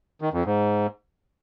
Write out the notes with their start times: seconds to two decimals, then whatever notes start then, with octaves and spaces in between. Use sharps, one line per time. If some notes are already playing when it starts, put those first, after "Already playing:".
0.21 D#3
0.33 F2
0.45 G#2